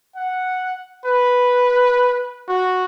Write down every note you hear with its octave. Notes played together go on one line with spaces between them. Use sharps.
F#5
B4
F#4